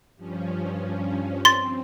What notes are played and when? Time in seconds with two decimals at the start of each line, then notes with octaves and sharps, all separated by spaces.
0.16 G2 F3 C#4
1.45 C4 C6 A6